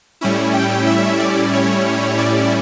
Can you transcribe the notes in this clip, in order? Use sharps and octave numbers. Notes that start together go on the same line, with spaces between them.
A2 G3 C#4 E4
G5
E5
D5
C#5
D5